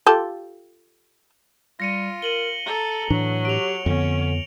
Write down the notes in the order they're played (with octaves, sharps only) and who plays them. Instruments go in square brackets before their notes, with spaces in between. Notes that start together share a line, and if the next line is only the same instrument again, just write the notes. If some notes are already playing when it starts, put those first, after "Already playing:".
[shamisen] F4 G4 A4
[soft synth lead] G3 [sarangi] F4 [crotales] A#6 C#7 D#7
[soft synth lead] A#4 [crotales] D#7 F#7 G7
[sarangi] A4 [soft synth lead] A#5
[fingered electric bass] A2 E3 D4 [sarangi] F#3
[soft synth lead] G4 [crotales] D7 F7
[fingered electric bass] F2 B3 [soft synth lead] D3 [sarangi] C#4